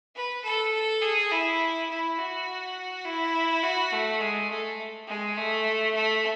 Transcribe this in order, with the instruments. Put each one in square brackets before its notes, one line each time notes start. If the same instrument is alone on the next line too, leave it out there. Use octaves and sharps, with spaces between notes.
[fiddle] B4
A4
G#4
E4
E4
F#4
E4
F#4
A3
G#3
A3
G#3
A3
A3